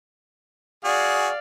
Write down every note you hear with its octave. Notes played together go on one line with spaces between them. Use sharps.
F#4 G#4 D5 F5